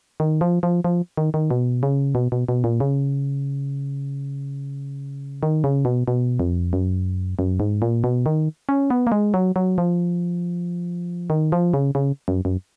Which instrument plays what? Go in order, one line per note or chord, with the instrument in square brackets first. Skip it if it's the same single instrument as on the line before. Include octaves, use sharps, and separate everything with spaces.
[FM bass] D#3
F3
F3
F3
D#3
D#3
B2
C#3
B2
B2
B2
A#2
C#3
D#3
C#3
B2
B2
F2
F#2
F#2
G#2
A#2
B2
D#3
C#4
B3
A#3
G#3
F#3
F#3
F3
D#3
F3
C#3
C#3
F#2
F#2